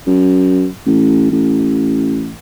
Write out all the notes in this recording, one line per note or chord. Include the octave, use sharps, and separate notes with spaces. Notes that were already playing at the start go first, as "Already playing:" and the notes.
F#2
A1
A1